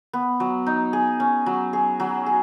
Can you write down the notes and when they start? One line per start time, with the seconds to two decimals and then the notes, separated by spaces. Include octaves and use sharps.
0.13 B3
0.40 F#3
0.67 D#4
0.93 G#4
1.20 C#4
1.46 F#3
1.73 G#4
2.00 F#3
2.26 G#4